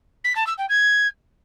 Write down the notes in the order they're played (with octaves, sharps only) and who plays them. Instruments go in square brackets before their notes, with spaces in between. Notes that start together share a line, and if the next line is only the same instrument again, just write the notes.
[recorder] B6
A5
E6
G5
G#6